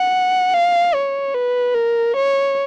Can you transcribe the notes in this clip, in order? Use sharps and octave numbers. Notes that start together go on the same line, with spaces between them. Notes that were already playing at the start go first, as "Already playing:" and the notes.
Already playing: F#5
F5
C#5
B4
A#4
C#5